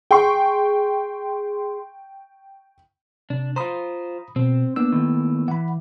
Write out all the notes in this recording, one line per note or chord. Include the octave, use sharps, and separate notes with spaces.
G#4 G5 C6 C#6
C3 D4
F4 C5 A#5 B5 D#6
B2 C4
A#3 B3 D4 E6
A2 D#3
E3 F#5 B5